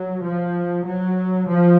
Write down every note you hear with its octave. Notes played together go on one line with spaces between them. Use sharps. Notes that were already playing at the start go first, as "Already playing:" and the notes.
Already playing: F#3
F3
F#3
F3